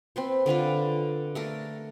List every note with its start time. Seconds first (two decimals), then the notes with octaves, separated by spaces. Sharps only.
0.16 C4 B4 C5
0.46 D3 C4 F4 B4
1.35 A3 A4 A#4